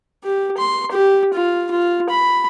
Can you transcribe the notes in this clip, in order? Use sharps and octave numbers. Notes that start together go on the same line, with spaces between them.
G4
C6
G4
F4
F4
B5